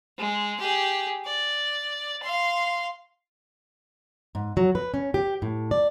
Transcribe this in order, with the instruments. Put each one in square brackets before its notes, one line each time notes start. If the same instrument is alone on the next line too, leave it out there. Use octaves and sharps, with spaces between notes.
[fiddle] G#3
G4 G#4
D5
F5 C6
[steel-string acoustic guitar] G#2
F#3
B4
C#4
G4
A2
D5